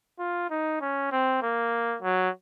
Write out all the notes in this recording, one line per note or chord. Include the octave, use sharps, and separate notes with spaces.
F4
D#4
C#4
C4
A#3
F#3